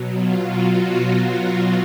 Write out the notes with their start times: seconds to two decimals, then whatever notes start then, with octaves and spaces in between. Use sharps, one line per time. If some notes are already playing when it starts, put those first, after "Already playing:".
Already playing: B2 F#3
0.10 F4
0.50 F#4